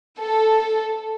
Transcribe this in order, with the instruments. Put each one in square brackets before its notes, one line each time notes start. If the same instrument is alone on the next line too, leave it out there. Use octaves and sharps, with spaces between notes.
[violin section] A4